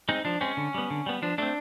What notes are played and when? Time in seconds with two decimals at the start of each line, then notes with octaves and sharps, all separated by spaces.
0.09 G#3 C4 D#4
0.25 F3 D4
0.41 G#3 C4 C#4
0.57 D3
0.74 G3 B3
0.90 D3
1.06 G3 B3
1.22 F3 D4
1.38 A3 C4 D4